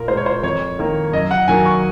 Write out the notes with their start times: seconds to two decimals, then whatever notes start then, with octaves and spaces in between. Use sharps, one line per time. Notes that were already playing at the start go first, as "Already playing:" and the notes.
Already playing: A#2 A#4
0.08 G#3 C5
0.17 C#5
0.26 C5
0.43 F2 C#5
0.79 D#3 A#3
1.13 F#2 D#5
1.31 F#5
1.48 D#3 F#3 A#3 G#5
1.65 C#6